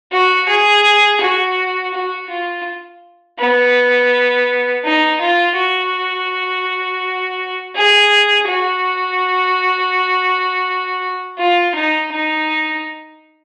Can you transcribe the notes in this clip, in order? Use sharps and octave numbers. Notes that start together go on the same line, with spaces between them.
F#4
G#4
F#4
F#4
F4
B3
D#4
F4
F#4
G#4
F#4
F4
D#4
D#4